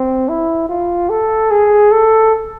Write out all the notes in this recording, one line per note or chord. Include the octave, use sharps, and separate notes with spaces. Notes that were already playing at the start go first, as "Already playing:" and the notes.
Already playing: C4
E4
F4
A4
G#4
A4